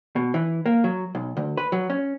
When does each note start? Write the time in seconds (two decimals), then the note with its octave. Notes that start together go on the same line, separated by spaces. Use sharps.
0.16 B2
0.34 E3
0.66 A#3
0.84 F#3
1.15 B1
1.37 D2
1.57 B4
1.72 F#3
1.90 C#4